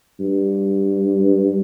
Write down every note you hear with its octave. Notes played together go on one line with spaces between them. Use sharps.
G2